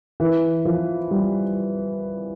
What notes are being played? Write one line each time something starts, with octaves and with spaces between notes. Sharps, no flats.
E3
F3
G3